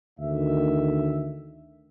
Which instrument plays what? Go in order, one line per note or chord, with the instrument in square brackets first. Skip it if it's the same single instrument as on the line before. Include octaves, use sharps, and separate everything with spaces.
[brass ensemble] D2 D#3 E5